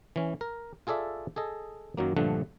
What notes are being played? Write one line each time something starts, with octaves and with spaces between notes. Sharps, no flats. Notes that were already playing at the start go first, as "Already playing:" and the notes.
E3 C#4
A#4
F4 G#4 A4 D5 E5
G#4 A4 D#5
F#2 D#3 F#3 A#3
A#1 G2 D3 F3 A3 F#5